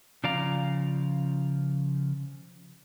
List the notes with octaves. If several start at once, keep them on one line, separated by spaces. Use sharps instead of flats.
C#3 F3 D5 F5 A#5